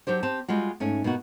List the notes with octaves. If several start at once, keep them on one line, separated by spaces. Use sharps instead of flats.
F#3 D4 G4 C5
C4 G4 A5
G3 G#3 F4 F#4
G#2 A3 C#4
B2 A#3 D#4 F#4